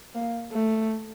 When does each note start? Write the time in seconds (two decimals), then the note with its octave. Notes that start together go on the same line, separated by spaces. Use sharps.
0.15 A#3
0.52 A3